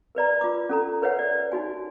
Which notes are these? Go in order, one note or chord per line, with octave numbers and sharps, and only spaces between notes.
A#4 B4 D5 A#5
F4 D6
C#4 A4 A#5
A#4 B4 C#5 E5 F#5
D5
D#4 F#4 G#5